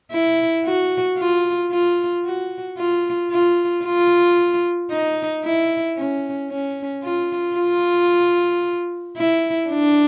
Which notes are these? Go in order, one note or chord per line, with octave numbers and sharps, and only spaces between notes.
E4
F#4
F4
F4
F#4
F4
F4
F4
D#4
E4
C#4
C#4
F4
F4
E4
D4